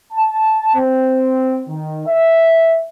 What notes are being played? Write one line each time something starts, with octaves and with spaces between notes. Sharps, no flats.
A5
C4
D#3
E5